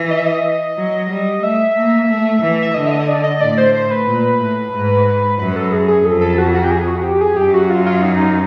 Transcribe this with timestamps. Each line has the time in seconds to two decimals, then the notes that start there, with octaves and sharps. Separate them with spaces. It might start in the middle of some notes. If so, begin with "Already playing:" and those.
Already playing: E3
0.11 D#5
0.18 E5
0.26 D#5
0.77 F#3
1.10 G3
1.43 A3 E5
1.76 A#3
2.09 A3
2.42 E3
2.62 E5
2.74 D3 D#5
2.86 E5
2.91 D#5
3.08 D5
3.24 D#5
3.40 A2 D5
3.58 C5
3.74 C5
3.91 B4
4.07 A#2
4.40 A2
4.72 G#2
5.39 F#2 B4
5.56 A4
5.72 G#4
5.88 G#4
6.05 F2 A4
6.21 A4
6.38 F#4
6.54 F#4
6.64 G4
6.71 G#4
6.87 F#4
7.03 G4
7.21 G#4
7.37 F#2 G4
7.54 F#4
7.70 F4
7.86 F4
8.03 D#4